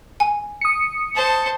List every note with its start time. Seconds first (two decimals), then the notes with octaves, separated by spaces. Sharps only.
0.20 G#5
0.61 D#6 C#7
1.15 C5 A5